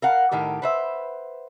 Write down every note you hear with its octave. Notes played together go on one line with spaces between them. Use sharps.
A#4 F5 F#5
A2 D#3 G4 A#4
B4 C5 E5